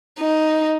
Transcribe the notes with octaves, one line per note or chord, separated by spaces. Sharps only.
D#4